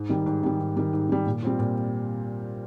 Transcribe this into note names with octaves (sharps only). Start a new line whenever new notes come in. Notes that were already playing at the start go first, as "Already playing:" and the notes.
Already playing: G#2
D#3 G3
G#2
D#3 G3
G#2
D#3 G3
G#2
D#3 G3
A#2
G3 C4 F4
A#2